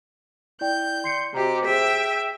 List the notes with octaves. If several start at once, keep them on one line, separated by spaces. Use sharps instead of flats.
E4 D5 G5 G6
C6 C7 C#7
C3 F#4 G4 D#5 A#5
G#4 E5 G5 B6